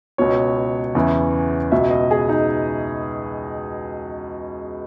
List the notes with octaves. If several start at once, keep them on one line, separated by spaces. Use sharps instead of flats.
C#2 B2 C#5
E2 C#3 E3
C#2 B2 E5
D#5
G#4
D#4